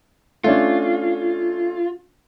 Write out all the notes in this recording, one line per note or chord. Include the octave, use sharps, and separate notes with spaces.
A3 C#4 D4 F4